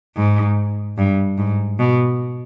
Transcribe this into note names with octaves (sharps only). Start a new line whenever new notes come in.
G#2
G2
G#2
B2